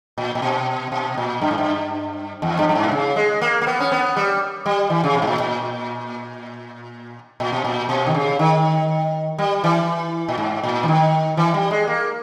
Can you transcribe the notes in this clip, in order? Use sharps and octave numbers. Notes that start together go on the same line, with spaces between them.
A#2
A#2
B2
B2
A#2
G2
G#2
G2
E2
G2
G2
G#2
B2
C#3
G#3
A#3
A#3
B3
C#4
B3
G3
G3
E3
C#3
B2
G#2
A#2
A#2
A#2
B2
A#2
B2
D#3
C#3
D#3
G3
E3
A#2
G#2
A#2
E3
D#3
E3
G3
G#3
A#3